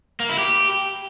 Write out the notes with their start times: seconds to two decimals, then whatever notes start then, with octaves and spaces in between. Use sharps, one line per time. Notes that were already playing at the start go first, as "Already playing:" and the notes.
0.20 A#3
0.29 E4
0.39 G4